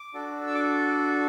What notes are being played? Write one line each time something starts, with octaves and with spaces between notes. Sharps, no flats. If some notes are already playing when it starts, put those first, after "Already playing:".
Already playing: D6
D4 F#4 A4
E6
D6